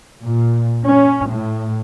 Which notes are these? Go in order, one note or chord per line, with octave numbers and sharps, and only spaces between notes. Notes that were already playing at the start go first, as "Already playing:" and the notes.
A#2
C#4
A2